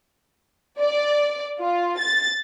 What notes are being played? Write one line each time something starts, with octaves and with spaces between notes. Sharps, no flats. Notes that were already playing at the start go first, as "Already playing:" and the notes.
D5
F4
A6